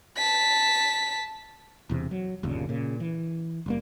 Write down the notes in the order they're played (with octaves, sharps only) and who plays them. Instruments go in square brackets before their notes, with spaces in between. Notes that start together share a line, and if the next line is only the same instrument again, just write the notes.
[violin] A5 B6
[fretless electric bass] E1 E2 C3
F#3
G1 D#2 A#2 C#3
A#2 C#3
E3
F#1 G3 A#3